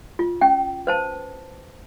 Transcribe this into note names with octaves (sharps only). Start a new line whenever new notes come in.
F4
C#4 G5
B4 C5 A5